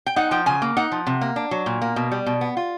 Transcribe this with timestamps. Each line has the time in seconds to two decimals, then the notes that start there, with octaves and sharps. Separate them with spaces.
0.06 G5
0.16 D#4 F#5
0.31 F3 G5
0.46 C#3 G#5
0.62 A#3
0.77 D#4 F#5
0.92 F3
1.07 C3
1.21 A#3
1.36 D4
1.51 F#3
1.66 A#2
1.82 A#3
1.96 B2
2.12 G3
2.26 B2
2.41 B3
2.57 F4